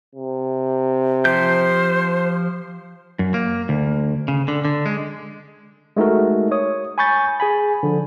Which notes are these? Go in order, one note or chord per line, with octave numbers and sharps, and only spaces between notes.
C3
F3 G4 C5 G6
F#2
A#3
D2
C#3
D3
D3
G#3
G#3 A3 D#4 F#4 A#4
C#5 D#6
G#5 B5 C#6 G6 A6
G#4 G#5 B5
D3 F3